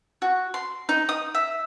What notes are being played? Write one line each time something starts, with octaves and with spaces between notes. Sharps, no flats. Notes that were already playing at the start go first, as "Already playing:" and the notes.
F#4
C6
D#4
D#6
E5